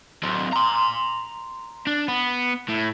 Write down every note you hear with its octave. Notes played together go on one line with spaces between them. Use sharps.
F#3 C4
A#5 C6
D4
B3
A2